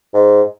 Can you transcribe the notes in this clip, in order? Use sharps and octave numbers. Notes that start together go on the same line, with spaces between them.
G#2